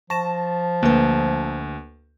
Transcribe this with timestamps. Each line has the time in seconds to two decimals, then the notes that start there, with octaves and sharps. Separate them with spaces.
0.10 F3 A5 C#6 A#6 E7
0.83 D2 A#3 B4